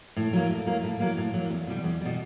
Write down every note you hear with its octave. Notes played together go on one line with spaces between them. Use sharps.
A2
F#3 A#3
A2
F#3 A#3
A2
F#3 A#3
A2
F#3 A#3
E2
B2 G3
E2
B2 G3